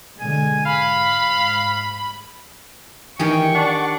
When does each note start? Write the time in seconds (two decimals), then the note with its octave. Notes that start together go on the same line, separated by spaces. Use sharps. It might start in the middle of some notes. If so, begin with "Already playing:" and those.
0.20 B2 D3 G#3 G#5
0.66 G#2 F5 B5
3.19 D#3 E3 G4 G#4 G5 C#6
3.55 D4 F#5